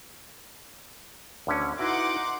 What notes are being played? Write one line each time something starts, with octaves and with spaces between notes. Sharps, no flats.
D2 D3 C#4
D#4 E4 F#4 B4 F#5 C6 D6